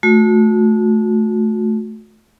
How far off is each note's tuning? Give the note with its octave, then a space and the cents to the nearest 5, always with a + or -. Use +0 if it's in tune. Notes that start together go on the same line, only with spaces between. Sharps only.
A3 -15 F#4 -35